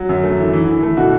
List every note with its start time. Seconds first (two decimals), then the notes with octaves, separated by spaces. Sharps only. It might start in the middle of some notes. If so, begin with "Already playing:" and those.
Already playing: F#3
0.09 F#2
0.24 A3
0.38 E3
0.53 E3
0.68 E3
0.83 A3
0.97 B2 F#4